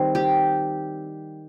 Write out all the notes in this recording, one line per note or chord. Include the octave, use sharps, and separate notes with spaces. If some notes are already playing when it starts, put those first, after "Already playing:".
Already playing: D#3 G3 C4
G4